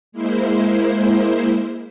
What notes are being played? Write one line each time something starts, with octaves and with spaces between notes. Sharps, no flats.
G#3 A#3 E4 C5